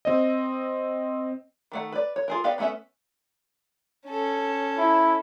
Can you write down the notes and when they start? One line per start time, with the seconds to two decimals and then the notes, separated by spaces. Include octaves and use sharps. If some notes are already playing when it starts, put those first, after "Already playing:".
0.05 C4 D#5
1.72 D#3 A3 F#5
1.92 B4 D5
2.16 C#5
2.28 F4 G#4 A#4
2.44 B3 G4 D5 F5
2.58 D#3 A3 B3 C#4 E5
4.08 C#4 A4
4.78 E4